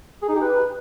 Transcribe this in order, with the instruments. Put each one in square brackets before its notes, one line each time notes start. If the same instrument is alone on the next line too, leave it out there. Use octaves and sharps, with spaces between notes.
[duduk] G#4
D#4
G4
B4